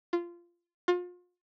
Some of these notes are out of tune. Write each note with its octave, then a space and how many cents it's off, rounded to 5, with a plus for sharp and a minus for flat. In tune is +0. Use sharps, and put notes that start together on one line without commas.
F4 -15
F4 +35